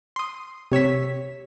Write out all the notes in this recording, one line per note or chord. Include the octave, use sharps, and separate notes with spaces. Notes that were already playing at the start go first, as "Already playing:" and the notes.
C6 D#6
C3 C#5 E6 B6